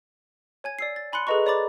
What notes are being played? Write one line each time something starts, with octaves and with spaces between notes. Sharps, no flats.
C#5 G#5 G#6
D5 E6 C7
A6
G#5 B5 C6 F#6 C#7
G#4 A4 B4 D#5 A#5 C#6
C#5 D5 A#5 B5 D6 A6